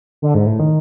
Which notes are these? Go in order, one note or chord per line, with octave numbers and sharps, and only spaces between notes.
D3
G#2
A2
D#3